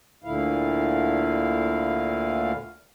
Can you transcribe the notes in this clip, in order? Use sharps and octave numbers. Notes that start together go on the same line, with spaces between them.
D2 A#2 D3 E4 F5